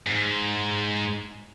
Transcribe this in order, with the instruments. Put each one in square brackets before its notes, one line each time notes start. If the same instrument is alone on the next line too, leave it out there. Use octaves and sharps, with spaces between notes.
[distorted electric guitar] G#2